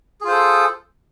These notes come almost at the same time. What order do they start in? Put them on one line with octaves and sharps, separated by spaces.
G#4 F4 C5 A4